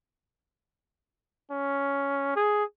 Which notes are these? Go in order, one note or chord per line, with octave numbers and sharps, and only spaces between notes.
C#4
G#4